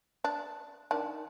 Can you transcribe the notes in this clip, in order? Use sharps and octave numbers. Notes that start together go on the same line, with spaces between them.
D4
D#3 D4